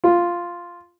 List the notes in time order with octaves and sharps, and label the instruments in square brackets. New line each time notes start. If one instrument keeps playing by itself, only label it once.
[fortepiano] F4